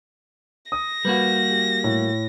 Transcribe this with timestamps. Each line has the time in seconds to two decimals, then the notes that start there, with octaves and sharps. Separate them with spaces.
0.72 D#6 A#6
1.05 G3 A#3 F#4 B4 B5
1.51 G4
1.84 A2